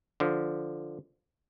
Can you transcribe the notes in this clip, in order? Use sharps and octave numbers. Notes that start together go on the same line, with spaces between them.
D3 F3